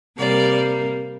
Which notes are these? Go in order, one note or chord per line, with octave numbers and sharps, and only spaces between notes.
C3 G3 A#3 D5